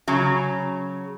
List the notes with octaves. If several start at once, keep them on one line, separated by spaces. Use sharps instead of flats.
C#3 F#3